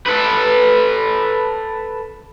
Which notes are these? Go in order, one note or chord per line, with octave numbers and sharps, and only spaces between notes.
A4 B4